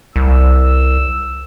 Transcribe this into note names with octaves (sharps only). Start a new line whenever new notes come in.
C2 E6